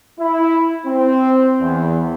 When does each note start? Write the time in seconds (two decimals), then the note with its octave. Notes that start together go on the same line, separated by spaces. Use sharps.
0.19 E4
0.86 C4
1.61 E2